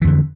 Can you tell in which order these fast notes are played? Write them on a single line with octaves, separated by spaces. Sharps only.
E3 F2 D3